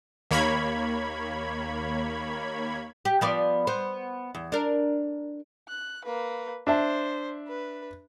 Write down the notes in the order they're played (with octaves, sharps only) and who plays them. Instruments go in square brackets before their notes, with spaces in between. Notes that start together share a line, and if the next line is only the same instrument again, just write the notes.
[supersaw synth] D#2 A#3 C#5 B5 G#6
[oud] G4
F3 B3 D5
B3 C5
E2
D4 A#4
[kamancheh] F#6
A#3 B4
[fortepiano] D4 E5 A5 [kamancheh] C5
[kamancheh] B4